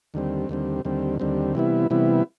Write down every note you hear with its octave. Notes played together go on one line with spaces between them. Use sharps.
D#2 D3 G3 C4
D#2 D3 G3 C4
D#2 D3 G3 C4
D#2 D3 G3 C4
C3 E3 G3 B3 E4
C3 E3 G3 B3 E4